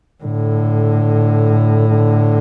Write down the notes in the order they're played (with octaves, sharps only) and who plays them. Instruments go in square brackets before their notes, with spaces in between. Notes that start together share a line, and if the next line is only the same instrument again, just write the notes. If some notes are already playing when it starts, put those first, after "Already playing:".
[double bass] A2 [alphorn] D3
[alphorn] D3